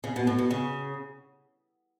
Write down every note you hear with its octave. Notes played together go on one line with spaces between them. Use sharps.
C#3
B2
A2
B2
C#3